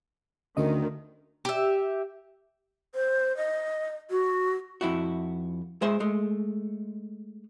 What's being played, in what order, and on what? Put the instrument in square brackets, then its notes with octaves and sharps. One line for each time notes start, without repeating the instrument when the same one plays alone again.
[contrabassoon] D2 [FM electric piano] D3 C#4 D#5 [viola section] D#3
[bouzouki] G4 E5
[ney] C5
D#5
F#4
[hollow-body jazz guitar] F2 E4 F#4
G#3 C5 E5
G#3 A3